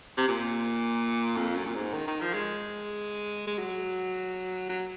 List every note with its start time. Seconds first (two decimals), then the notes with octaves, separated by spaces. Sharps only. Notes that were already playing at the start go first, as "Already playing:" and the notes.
0.17 C3
0.28 A#2
1.37 F2
1.56 F#2
1.66 A#2
1.75 G#2
1.93 D#3
2.07 D#3
2.21 F3
2.34 G#3
3.47 G#3
3.59 F#3
4.69 F#3